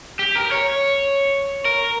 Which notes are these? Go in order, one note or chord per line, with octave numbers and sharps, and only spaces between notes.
G4
A#4
C#5
A#4